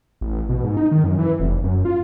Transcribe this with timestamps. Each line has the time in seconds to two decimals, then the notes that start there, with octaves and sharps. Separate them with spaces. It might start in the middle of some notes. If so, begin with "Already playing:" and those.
0.21 A1
0.49 B2
0.64 G#2
0.77 D#4
0.92 D#3
1.04 F#2
1.19 E3
1.39 F1
1.64 F#2
1.85 F4